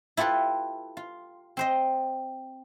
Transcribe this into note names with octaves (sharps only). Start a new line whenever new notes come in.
E4 F4 G4 A4 B4
F4
C4 C5 D#5